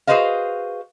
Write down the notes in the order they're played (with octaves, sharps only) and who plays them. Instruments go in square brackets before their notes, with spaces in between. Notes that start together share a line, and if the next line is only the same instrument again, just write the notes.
[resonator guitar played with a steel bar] F#4 G#4 B4 C5 D#5 F5